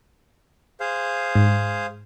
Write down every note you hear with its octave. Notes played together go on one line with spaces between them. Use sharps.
G#4 C5 F5
G#2